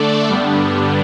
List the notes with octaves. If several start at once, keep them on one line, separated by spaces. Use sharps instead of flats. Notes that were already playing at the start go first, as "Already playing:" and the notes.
Already playing: D3 A3 D4 A4 D5
G2 D3 G3 B3 D4